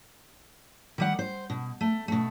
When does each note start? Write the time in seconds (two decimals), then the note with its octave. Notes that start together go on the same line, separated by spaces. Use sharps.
0.98 D#3 G3 F#5
1.19 C5
1.50 B2
1.81 A3
2.08 B2 A3